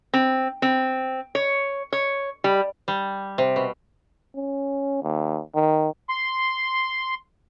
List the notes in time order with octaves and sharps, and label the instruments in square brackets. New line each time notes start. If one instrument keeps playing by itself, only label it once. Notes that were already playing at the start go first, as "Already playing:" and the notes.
[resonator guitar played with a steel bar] C4
C4
C#5
C#5
G3
[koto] G3
C3
B2
[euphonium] C#4
D#2
D#3
[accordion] C6